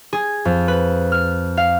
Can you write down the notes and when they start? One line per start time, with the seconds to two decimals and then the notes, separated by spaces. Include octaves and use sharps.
0.13 G#4
0.45 F2
0.68 B4
1.12 F6
1.57 F5